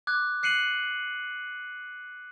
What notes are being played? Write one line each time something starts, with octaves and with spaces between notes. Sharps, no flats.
D6 F#6 G#6
F#6 C7 C#7 D#7 F#7